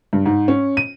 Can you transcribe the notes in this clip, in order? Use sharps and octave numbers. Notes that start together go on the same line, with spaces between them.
G2
G#2
C#4
D#7